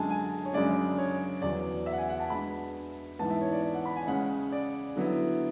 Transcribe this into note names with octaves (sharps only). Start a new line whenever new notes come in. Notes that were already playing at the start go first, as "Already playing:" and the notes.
Already playing: F#2 D3 G#3 D4 G#5 A5
G#5
C#5
F#2 C#3 G#3 D4 D5
C#5
E2 B2 F#3 D5
E5
F#5
G#5
F#5
A5
B2 G#3 D4 B5
G#2 E3 B3 A5
E5
C#5
D5
D5
F#5
B5
G#5
C#3 G#3 C#4 F#5
D5
D3 F#3 B3 E4